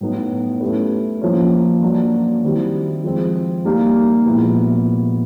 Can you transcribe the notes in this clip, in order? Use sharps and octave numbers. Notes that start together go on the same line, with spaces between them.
A2 F#3 B3 D#4
A3 C#4 E4 G4 B4
F3 A#3 C#4
F#3 A#3 D4 F#4
D#3 G3 C4 E4 G4
F3 G#3 C4
G3 A#3 D#4 G4
A#2 F3 G#3 B3 E4